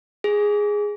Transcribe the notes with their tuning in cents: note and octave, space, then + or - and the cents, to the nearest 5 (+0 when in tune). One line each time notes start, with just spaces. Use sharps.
G#4 -5